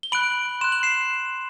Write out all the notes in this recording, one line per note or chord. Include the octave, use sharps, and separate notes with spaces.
G7
B5 F#6 D7 F#7
C6 F#6 E7
F#7
C7 E7